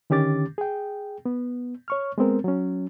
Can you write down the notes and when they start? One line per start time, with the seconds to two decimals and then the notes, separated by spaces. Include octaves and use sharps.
0.10 D3 D#3 C#4 G4 D6 A6
0.58 G#4 G5
1.26 B3
1.88 C#5 C#6 F6
2.18 G#3 B3 C4 A#4
2.44 F#3 C#4